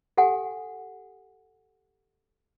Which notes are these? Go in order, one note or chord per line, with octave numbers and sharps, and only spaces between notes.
G4 A4 F#5 G#5